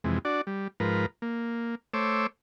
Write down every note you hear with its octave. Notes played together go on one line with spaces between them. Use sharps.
F2 C3 E3 G#3
D4 F#4 D5
G3
G#2 F3 A#4 B4
A#3
A3 C5 C#5 D6 E6